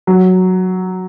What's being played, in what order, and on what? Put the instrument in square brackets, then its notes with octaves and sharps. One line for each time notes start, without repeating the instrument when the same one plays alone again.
[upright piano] F#3